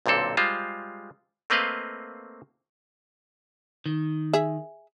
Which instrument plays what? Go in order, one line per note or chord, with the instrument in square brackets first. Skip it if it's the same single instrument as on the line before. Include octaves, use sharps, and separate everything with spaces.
[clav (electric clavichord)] B1 A#2 D3 C4 A4
G3 G#3 F4 C5
A3 A#3 C4 B4 D#5 F5
[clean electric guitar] D#3
[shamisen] G#4 E5